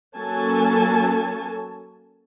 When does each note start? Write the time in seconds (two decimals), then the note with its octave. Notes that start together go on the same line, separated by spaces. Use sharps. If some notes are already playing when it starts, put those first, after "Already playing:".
0.16 F#3 A#3 C#4 A4 G#5 A5